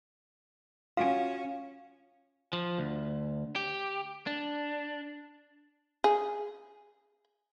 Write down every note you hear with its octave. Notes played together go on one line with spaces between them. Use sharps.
C#4 F4 F#4 F5 G#5
F3
D2
G4
D4
G#4